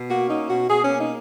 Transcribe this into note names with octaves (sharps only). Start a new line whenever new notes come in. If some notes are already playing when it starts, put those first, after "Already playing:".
Already playing: B2
A#3 F#4
C#4 D#4
B2 F#4
B2 G#4
C#4
A#3
D#4